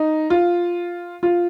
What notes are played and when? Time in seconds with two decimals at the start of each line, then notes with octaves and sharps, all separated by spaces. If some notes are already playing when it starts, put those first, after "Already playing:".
Already playing: D#4
0.30 F4
1.23 F4